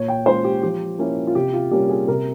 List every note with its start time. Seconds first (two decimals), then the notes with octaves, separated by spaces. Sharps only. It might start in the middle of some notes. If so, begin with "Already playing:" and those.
Already playing: A#2 C#5
0.08 G5
0.26 G#3 C#4 F4 C5
0.44 G4
0.63 F3 G4
0.99 A#3 C#4 E4
1.27 F4
1.35 C3 G4
1.53 F4
1.71 G3 A#3 C#4 G4
1.89 G#4
2.08 C3 A#4